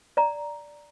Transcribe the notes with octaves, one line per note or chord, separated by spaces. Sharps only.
D5 A#5